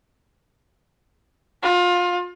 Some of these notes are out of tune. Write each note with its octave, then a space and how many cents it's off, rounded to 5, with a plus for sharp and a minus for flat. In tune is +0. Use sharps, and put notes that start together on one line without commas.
F4 +25